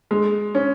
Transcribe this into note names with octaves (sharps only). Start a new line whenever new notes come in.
G#3
C#4